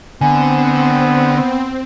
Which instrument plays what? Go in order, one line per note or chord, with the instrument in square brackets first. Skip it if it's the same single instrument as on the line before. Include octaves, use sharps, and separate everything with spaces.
[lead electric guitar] D3 [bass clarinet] B3 [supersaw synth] C4 [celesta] G#5